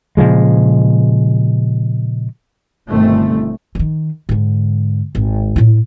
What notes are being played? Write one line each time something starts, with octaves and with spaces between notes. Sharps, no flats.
A#2 C#3 F3 G#3
G1 B2 D#3 A3 C4
D3 D#3
G#2 D3
G#1
A2 E4